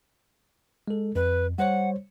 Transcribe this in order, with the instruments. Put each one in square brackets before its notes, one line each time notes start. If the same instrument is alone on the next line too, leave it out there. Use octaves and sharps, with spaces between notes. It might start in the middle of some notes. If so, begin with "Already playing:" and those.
[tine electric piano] G#3 A4
[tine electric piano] F2 [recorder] B4
[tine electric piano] G3 C5 C#5 [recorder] F#5